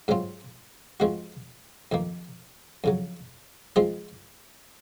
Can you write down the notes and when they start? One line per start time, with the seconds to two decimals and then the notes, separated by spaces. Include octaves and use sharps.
0.08 G#2 F#3 C4 F4
1.00 F3 G#3 C4 F#4
1.92 F2 D#3 A#3
2.84 F2 C#3 F#3
3.76 F3 G#3 C4 F4 G#4